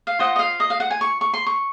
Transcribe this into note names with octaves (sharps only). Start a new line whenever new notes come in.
F5
F4 C5 D#5 F#5
D#5
F5
D#5
F5
F#5
G#5
C#6
C#6
C6
C#6